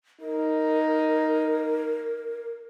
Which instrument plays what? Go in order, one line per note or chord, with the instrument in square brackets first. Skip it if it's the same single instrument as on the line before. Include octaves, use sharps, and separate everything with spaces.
[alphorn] D#4 [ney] A#4